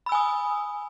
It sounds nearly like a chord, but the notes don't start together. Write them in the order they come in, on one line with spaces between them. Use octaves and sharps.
B5 E6 G#5 D#6